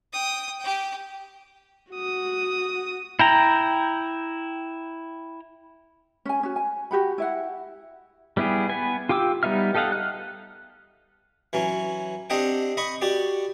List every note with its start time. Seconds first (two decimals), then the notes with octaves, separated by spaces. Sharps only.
0.13 G5 D#6
0.60 G4 G5
1.92 F#4 D#6
3.19 E4 G5 A#5
6.25 C#4 G#5
6.43 C#4 F#4
6.56 G#5
6.91 F#4 G4 F#5 B5
7.18 E4 E5 F#5
8.37 G3 B3 E4 G4 G#4
8.69 B3 B4 G#5
9.09 F4 G4 G5 D6 E6
9.43 G3 B3 D#4 E5 F6
9.74 G4 A4 D#5 F5 F#5
9.92 F6 F#6
11.53 E3 F#3 C#4
12.30 C4 D4 G4 D#5 F#5 G5
12.77 D#5 B5 C#6
13.01 F#4 G4 D5